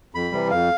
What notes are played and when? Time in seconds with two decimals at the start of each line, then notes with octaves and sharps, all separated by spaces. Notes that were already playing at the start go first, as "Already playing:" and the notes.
0.15 F2 B5
0.32 C3 E3 G3
0.51 F2 F5